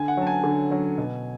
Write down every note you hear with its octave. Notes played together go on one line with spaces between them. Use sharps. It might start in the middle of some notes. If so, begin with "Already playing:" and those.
Already playing: D3 G#5
F#5
F#3 C#4 A5
G#5
D3
F#3 C#4
B2